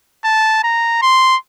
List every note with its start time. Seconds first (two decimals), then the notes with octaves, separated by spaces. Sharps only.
0.25 A5
0.64 A#5
1.02 C6